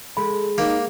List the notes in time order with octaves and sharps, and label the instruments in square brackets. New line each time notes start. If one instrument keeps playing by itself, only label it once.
[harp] G#3 [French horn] A4 [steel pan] B5
[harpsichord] A#3 G4 [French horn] D#4